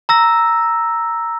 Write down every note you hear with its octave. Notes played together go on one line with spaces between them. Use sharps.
A#5 E6 A#6